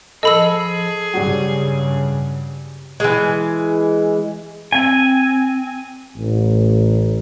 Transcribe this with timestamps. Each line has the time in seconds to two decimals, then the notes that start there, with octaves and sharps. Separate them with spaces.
0.23 F3 G#4 A4 D#5 B5 E6
1.14 G2 C#3 F#3 G3
3.00 E3 G#3
4.72 C4 G#5
6.16 A1